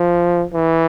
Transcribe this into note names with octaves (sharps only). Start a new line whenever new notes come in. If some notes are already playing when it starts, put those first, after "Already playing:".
Already playing: F3
E3